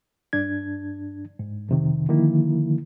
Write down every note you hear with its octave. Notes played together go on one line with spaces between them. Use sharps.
G2 D4 G#6
G#2
F2 C3 D#3
D3 D#3 F3 A#3 E4